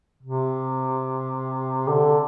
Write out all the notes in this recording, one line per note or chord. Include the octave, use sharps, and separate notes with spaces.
C3
D3